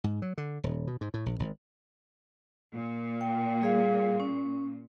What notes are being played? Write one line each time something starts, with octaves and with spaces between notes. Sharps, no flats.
G#2
F#3
D3
D#1
B2
G#2
A2
A#1
G#1
A#2
G5
G3 G#4 F5
C#4